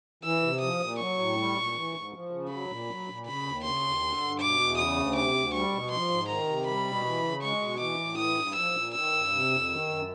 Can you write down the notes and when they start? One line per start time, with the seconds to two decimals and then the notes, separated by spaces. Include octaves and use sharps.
0.24 E3 E6
0.42 C3
0.61 F3 D#6
0.81 A#2
0.99 F#3 C#6
1.19 A2
1.37 G3
1.56 A#2
1.75 E3
1.93 G#2
2.13 F3
2.31 C#3
2.50 F#3 B5
2.69 A#2
2.88 F#3
3.08 A#2
3.26 C#3 B5
3.45 D#2
3.64 C#3 C6
3.83 D#2
4.02 D3
4.21 G2
4.40 B2 D6
4.59 E2
4.78 C#3 D#6
4.96 D2
5.15 C3 D6
5.34 D2
5.54 G3 C#6
5.72 B2
5.91 F3 C6
6.10 G#2
6.28 D#3 A#5
6.48 C3
6.67 G3 B5
6.85 B2
7.05 E3
7.23 C#3
7.42 G#3 C#6
7.62 B2
7.80 E3 D6
7.99 A2
8.18 E3 D#6
8.37 G2
8.55 F3 E6
8.75 A#2
8.94 D#3 E6
9.13 G2
9.32 C3
9.51 F2
9.69 D#3
9.88 F#2